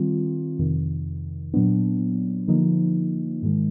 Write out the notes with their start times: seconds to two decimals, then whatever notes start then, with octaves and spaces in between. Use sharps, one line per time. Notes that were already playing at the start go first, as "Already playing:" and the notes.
Already playing: D#3 G3 C4 F4
0.59 F2 C3 D#3
1.54 A#2 F#3 B3 D4
2.48 D3 F3 A#3 D#4
3.42 G#2 D#3 G#3